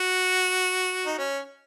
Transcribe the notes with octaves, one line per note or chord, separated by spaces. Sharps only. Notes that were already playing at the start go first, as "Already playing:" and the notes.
Already playing: F#4
D#4
C#4